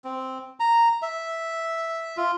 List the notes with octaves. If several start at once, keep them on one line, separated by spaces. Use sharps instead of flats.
C4
A#5
E5
F4